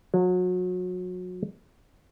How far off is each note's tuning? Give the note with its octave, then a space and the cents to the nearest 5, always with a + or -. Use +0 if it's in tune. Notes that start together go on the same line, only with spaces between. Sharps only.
F#3 -30